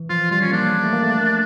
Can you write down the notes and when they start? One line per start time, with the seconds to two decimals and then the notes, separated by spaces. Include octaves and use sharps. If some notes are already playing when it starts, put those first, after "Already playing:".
Already playing: E3
0.10 F3 F4
0.31 G3 F4
0.41 C#4
0.52 A#3 D4
0.84 A3
0.93 A#3
1.03 A3